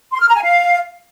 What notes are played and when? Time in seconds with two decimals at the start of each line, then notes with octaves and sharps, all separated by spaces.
0.13 C6
0.20 F6
0.28 A#5
0.36 G#5
0.44 F5